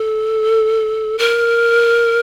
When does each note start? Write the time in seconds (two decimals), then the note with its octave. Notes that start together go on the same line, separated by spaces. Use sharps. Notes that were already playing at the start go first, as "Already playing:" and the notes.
Already playing: A4
1.19 A#4